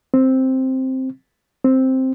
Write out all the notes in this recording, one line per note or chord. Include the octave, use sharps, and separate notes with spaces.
C4
C4